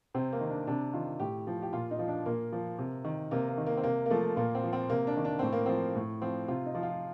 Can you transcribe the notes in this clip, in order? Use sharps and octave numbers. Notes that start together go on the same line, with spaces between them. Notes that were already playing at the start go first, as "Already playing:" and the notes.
C3 C4
A#3
D#3
D4
C3 D4
D#3 F4
A2 G4
F3
G4
A#2 F4
D#4
F3
D4
A#2 A#3
F3
C3
D#3
C3 A#3
A#3
D#3
A#3
C4
C3 A#3
A#3
F3 A3
A#2 A#3
C4
F3
C4
C3 A#3
D4
D#3
D4
A2 C4
A#3
F3 C4
A2
F3 C4
C3 F4
D#4
F3
F4